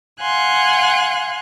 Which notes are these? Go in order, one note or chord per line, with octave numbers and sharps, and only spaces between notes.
F5 F#5 G#5 C6 F#6